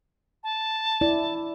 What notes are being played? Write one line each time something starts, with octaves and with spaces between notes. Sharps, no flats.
A5
E4 D5